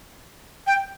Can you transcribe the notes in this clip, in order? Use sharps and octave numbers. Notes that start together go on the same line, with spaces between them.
G5